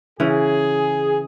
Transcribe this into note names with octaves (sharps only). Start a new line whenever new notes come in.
C#3 E3 G#4